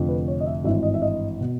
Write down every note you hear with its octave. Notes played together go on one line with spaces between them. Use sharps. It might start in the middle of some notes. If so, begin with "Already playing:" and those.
Already playing: F1 F2 D3
B4
C#5
D#5
E5
G#1 G2 E3 E5
D#5
E5
D#5
B2